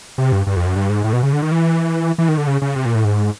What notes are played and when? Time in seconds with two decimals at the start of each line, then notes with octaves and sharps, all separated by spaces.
0.18 C3
0.32 G2
0.47 G2
0.56 F2
0.66 F#2
0.76 G2
0.90 G#2
1.04 A2
1.13 B2
1.23 C#3
1.33 D3
1.42 D#3
1.52 E3
2.18 E3
2.28 D#3
2.38 D3
2.47 C#3
2.62 C#3
2.76 C3
2.86 A#2
2.95 A2
3.05 G#2